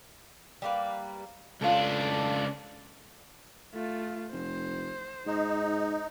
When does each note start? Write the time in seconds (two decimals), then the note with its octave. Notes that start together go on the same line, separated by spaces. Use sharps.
0.62 G3 A#3 B4
1.61 C#2 D4 F4 A4
3.74 A3 F4
4.33 F1 C5
5.27 G#2 D#4